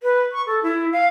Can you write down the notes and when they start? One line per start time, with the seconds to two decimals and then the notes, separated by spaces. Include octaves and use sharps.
0.03 B4
0.32 C#6
0.47 A4
0.63 E4
0.92 F5